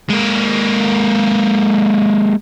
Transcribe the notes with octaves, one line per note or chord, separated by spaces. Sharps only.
G#3 A#3